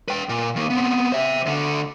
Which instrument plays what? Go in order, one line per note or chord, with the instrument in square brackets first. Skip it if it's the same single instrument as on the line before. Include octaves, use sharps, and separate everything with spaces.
[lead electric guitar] B4 G5
A#2
D#3 A#3
B3 C4
C5 E5
D2 D3